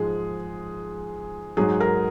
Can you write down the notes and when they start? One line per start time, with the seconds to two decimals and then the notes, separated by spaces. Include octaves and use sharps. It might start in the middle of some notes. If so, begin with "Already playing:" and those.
Already playing: G#2 F3 G#3 G#4
1.57 G#2 F#3 G#4
1.80 A#4